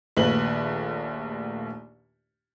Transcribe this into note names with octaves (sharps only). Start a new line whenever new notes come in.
A#1 D#2 A3 B4 F#7